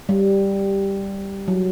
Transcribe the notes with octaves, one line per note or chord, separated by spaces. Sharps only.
G3
F#3